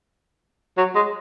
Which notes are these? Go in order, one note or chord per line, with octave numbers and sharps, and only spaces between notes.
F#3
G#3